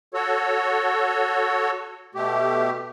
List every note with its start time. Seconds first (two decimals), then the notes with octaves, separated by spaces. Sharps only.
0.14 F#4 A4 C#5
2.15 B2 A3 G4